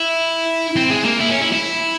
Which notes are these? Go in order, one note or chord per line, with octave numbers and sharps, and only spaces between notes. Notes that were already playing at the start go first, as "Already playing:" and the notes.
Already playing: E4
C4
G#3
A#3
E4
C#4
E4
E4